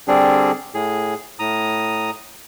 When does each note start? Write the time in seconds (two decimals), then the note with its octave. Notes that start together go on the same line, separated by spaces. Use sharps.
0.08 D3 G3 C4 D4 G#4
0.74 A2 G#4
1.39 A2 A#5 D#6